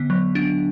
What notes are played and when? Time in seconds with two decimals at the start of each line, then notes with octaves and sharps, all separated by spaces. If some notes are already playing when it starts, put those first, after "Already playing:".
Already playing: D3 B3
0.10 F#3
0.35 D4